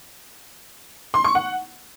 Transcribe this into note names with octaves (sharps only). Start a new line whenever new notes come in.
C6
C#6
F#5